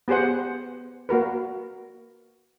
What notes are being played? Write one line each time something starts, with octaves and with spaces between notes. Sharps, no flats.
B3 G4 G#4 C5 F#5
A#3 F#4 A#4 B4